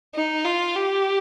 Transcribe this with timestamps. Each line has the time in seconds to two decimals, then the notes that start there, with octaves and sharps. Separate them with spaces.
0.15 D#4
0.45 F4
0.76 G4